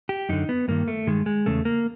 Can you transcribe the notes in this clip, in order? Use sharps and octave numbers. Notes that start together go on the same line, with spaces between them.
G4
F#2 D3 D#4
B3
G2 D#3 A#3
A3
G2 D#3 G#3
G#3
E2 C#3 A3
A#3